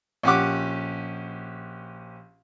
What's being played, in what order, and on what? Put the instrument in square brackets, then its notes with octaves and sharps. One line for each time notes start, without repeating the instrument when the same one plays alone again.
[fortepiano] A#1 C#4 G4 F#5 D6